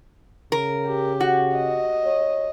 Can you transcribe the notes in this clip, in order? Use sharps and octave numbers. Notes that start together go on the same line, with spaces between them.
C#3 A#4
G4
F#4
D#5
C#5